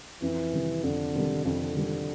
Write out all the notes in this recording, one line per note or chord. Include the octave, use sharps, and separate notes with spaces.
F2 E3
C3 D#3 G3
F2 D3
C3 D#3 G3
F2 D3
C3 D#3 G3